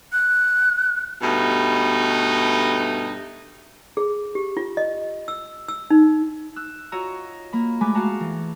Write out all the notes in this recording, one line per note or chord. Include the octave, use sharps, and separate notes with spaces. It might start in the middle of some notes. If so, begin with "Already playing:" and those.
F#6
G2 B2 A3 D#4
G#4
G4
F4
D#5
E6
E6
D#4
E6 F#6
F4 F#4 C#5 D#5 A#5 E6
A#3 A#4 B5
G#3 A3 G#5 B5 D6 F#6
F#4 G#4 F5 F#5 A5 A#5
E3